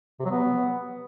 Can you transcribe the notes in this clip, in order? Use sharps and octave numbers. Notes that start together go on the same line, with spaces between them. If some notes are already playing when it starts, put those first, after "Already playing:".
C3
F#3
B3